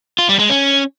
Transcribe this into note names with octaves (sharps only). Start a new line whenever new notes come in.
F4
G3
G#3
C#4